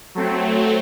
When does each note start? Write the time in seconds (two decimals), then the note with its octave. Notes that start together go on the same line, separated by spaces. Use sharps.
0.15 F#3 A3 C4